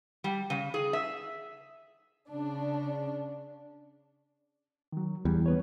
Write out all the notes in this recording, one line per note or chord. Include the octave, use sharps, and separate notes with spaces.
G3
C#3
G#4
E5
C#3 D4
D#3 F#3
E2 G3
B3 B4 C#5